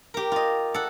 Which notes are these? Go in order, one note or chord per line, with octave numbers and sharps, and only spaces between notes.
G4 A#4
F4 D#5
A4 F#5